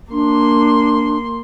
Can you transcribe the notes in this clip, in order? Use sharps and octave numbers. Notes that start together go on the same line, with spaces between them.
A#3 D4 C6